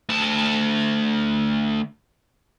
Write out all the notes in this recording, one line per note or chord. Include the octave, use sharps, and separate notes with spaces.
D2 A5